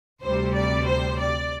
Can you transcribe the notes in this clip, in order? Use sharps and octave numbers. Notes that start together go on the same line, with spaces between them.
D2 C3 G3 C5
D5
C5
D5